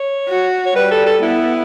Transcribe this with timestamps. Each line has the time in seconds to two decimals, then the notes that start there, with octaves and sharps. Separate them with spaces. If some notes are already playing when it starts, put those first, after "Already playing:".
Already playing: C#5
0.29 F#4
0.66 C#5
0.76 G3 B4
0.91 A4
1.06 A4
1.22 B3 E4